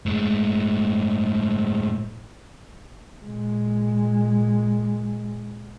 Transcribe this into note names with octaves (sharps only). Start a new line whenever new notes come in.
A2 G#3
A#2 G#3